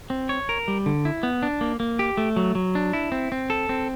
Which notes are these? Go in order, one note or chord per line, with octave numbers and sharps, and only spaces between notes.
C4
C#5
A#4
G3
D3
E4
B3
D4
A#3
A#3
G4
A3
F#3
F#3
D4
E4
C4
C4
A4
C4